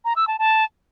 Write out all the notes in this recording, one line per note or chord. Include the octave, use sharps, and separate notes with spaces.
A#5
E6
A5
A5